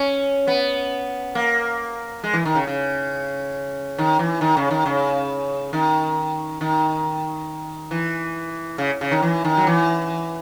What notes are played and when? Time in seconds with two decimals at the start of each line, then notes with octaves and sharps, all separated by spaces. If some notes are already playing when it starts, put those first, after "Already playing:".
Already playing: C#4
0.47 B3
1.35 A#3
2.24 G#3
2.33 E3
2.45 D#3
2.55 C#3
2.67 C#3
3.98 D#3
4.19 E3
4.41 D#3
4.57 C#3
4.71 D#3
4.86 C#3
5.73 D#3
6.61 D#3
7.91 E3
8.78 C#3
9.01 C#3
9.11 D#3
9.22 E3
9.45 D#3
9.57 F#3
9.67 E3